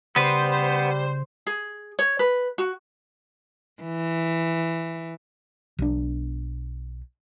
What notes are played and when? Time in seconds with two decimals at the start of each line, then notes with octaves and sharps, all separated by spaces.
0.16 C#3 G3 B3 B4 C5
1.47 G#4
1.99 C#5
2.19 B4
2.58 F#4
3.83 E3
5.79 B1 D4